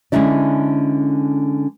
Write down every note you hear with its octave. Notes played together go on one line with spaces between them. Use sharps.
D3 G#3 C#4 D#4 E4 D5